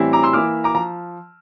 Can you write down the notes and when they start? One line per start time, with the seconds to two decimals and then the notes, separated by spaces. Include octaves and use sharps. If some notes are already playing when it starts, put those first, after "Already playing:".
Already playing: A2 E3 G3 C4 E4
0.13 A#5 D6
0.23 C6 E6
0.33 E3 A#3 E4 D6 F6
0.64 A#5 D6
0.75 F3 A#5